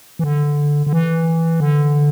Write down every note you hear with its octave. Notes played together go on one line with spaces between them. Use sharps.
E3
D3
D3
E3
D3